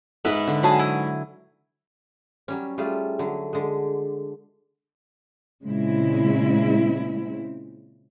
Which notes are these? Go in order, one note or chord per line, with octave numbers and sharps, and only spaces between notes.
G#2 B4 E5
D3
F#3 G#4 G#5 A5 B5
E4
F#3 G3 C#4
G3 A3 F4 G#4
D3 F#3
D3 G#3
A#2 C#3 G#3 C4 E4